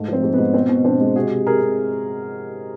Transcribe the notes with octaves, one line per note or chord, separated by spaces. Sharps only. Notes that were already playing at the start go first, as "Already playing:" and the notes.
Already playing: G#2 A3
F3 C4
G#2
B3
G#2
B2 C4
B2
B2 C4 D4
G#3
C3 F#4 G#4
C3
C3 G#4 A#4
C3